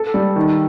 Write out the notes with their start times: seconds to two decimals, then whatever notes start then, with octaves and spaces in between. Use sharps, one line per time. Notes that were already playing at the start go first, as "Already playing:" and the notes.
Already playing: A4
0.14 G3
0.36 D#3